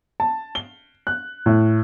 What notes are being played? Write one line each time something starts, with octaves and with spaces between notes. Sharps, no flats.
A5
G7
F#6
A2